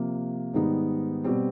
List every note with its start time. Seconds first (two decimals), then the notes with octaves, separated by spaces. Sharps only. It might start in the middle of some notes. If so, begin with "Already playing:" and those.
Already playing: C3 F3 A#3
0.54 G#2 D#3 G3 B3 D#4
1.24 B2 G3 C4